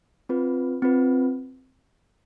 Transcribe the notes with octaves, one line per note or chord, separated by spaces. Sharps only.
C4 F4 B4
C4 F4 B4